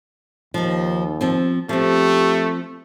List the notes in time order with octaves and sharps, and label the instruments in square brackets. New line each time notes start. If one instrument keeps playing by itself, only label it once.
[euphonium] D#2 [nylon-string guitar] F3 D#4
[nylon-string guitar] F3 C4
[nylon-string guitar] F3 C4 [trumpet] A3 [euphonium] G4